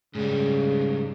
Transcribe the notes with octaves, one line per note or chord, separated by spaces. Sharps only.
G#2 C#3 G3